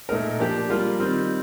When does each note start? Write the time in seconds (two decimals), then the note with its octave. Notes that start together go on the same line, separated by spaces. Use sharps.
0.09 A#2 A3 D#4 A#4
0.39 F3 A#3 D4 G4
0.70 G3 A#3 F4 A#4
1.00 D#3 G3 C4 F4